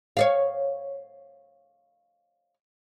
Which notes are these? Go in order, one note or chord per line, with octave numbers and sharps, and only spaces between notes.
C#5 D5 F5